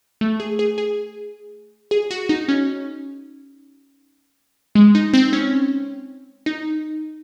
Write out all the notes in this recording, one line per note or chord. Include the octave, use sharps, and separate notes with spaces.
A3
G#4
G#4
G#4
G#4
F#4
D#4
C#4
G#3
D#4
C4
C#4
D#4